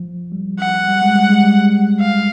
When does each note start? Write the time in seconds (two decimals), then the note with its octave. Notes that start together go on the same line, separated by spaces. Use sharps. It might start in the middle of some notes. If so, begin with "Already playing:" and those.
Already playing: F3
0.32 G3
0.59 F#5
0.88 G3
1.02 G#3
1.15 G3
1.30 G#3
1.43 G3
2.00 F5